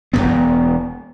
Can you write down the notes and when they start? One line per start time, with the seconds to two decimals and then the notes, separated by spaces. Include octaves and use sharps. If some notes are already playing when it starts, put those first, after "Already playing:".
0.13 E1 D#2 B3